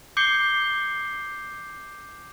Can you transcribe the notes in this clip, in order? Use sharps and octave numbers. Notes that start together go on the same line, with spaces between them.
D6 G6 C7 C#7 G7